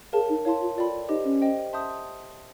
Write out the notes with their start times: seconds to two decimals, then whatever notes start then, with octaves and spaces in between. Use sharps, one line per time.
0.13 G#4 A#4 C#5 F5 A5
0.29 D#4
0.45 E4 C#5 F5 A5 C6
0.61 F4
0.77 F4 A4 D5 G5 B5
1.09 D#4 G4 C5 D#5
1.25 C#4
1.41 C5 D#5 G5
1.73 E5 A5 C6 D#6 G6